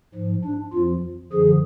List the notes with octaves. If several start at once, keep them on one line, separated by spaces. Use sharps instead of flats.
G#2 F3
D4
F2 F3 F4
F#2 D3 F3 G#4